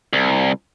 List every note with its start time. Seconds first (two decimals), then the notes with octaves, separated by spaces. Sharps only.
0.13 C2